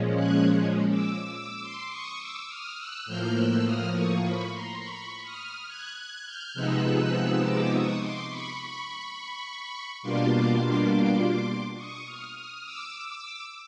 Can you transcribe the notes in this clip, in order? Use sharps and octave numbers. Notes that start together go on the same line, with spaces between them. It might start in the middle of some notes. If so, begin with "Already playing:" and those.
Already playing: A#2 F3 G#3 C#4
F#6 G#6
D6 E6
D6 E6
C6 D6
C#6 D#6
D6 E6
D#6 F6
E6 F#6
A2 F3 A#3 F6 G6
E6 F#6
D#6 F6
C#6 D#6
B5 C#6
A#5 C6
B5 C#6
D#6 F6
F#6 G#6
F#6 G#6
F6 G6
C3 F3 G#3 B3 D#4 E6 F#6
E6 F#6
D6 E6
C#6 D#6
C6 D6
B5 C#6
B2 G3 A#3 D4 F4 C6 D6
C#6 D#6
D#6 F6
D#6 F6
D6 E6